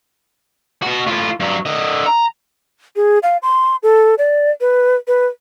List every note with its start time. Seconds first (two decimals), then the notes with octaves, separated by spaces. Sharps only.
0.82 B2 F#4
1.06 A2 F4
1.40 G2 F#3
1.66 D3 D#5
2.06 A#5
2.96 G#4
3.23 F5
3.43 C6
3.83 A4
4.18 D5
4.61 B4
5.08 B4